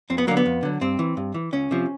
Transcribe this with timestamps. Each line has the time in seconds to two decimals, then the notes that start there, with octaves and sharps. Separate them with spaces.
0.10 F2 C4
0.18 B3
0.27 F#3 A#3
0.31 D3
0.37 B3
0.46 F2
0.63 D3 F#3
0.81 G2 C4
0.99 E3
1.17 G2
1.34 E3
1.53 C#2 C#4
1.71 C3 F3